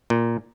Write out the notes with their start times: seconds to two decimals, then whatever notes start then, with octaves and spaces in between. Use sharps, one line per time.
0.10 A#2